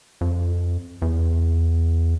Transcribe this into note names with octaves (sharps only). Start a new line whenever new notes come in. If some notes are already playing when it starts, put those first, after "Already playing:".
F2
E2